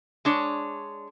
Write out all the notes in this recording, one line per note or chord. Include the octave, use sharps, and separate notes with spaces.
G#3 D4 C#5